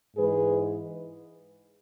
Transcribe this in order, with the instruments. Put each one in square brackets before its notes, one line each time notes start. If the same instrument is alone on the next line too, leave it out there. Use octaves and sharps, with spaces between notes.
[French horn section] G#2 E3 G#3 G#4 B4